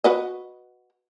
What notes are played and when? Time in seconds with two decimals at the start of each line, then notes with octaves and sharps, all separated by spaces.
0.04 F#4 B4 D#5